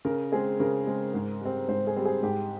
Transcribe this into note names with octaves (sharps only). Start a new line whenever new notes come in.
C#3 A#4
G#3 C4 G#4
C#3 A#4
G#3 C4
G#2
G3 C4
G#2 C5
G#4
G3 C4
G#4
G#2 G4